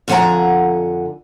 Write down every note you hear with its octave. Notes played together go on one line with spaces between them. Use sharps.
F2 D3 F3 F#5 G#5 A#5